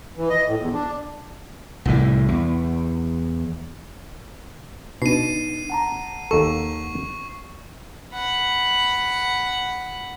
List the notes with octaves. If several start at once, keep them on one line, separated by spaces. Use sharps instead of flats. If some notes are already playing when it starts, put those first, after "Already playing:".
E3
D#5
A2
E2
D4
C2 A2 E3
E2
B2 D4 D#4 C7 D#7
F#5 A5 A#5
D#2 A4 C#6
F#5 B5